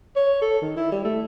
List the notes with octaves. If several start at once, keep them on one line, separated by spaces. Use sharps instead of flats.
C#5
A4
D#3
E4
G3
A3